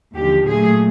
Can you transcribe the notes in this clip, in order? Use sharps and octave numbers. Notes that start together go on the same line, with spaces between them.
D#2 D3 F3 G4
A#2 F#3 A3 G#4